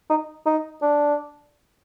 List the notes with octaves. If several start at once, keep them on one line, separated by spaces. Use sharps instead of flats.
D#4
D#4
D4